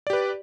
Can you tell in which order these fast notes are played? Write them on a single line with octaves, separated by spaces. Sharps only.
D5 G4 B4